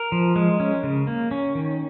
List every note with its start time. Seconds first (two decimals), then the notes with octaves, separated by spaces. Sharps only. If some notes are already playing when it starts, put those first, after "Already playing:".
Already playing: A#4
0.12 F3
0.36 G#3
0.60 C#4
0.83 C#3
1.07 A#3
1.31 C#4
1.55 D#3